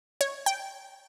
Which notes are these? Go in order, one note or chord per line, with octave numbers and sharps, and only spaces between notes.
C#5
G5